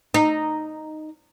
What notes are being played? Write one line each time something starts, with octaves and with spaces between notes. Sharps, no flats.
D#4